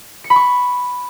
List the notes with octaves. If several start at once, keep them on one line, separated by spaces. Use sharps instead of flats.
C#7
B5
C#6